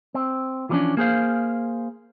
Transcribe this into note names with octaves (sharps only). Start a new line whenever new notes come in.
C4
E3 F3 G3 A3 C#4 D4
A#3 G#4 C5 F5